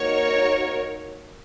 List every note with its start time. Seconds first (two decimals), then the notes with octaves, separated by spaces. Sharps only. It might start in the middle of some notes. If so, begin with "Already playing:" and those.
Already playing: A#3 D#4 F#4 A#4 C#5